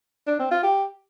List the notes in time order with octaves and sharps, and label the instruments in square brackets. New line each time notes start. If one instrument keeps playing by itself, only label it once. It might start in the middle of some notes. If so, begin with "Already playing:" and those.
[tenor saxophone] D4
C4
F4
G4